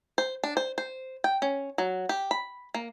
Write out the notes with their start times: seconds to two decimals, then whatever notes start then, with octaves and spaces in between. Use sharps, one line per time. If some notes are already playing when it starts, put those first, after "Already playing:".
0.18 C5
0.44 D4
0.57 C5
0.78 C5
1.24 G5
1.42 C#4
1.78 F#3
2.09 G4
2.31 B5
2.74 A#3